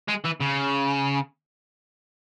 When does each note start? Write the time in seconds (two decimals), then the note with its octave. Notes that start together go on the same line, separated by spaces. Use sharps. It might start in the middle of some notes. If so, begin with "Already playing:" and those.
0.09 G#3
0.25 E3
0.41 C#3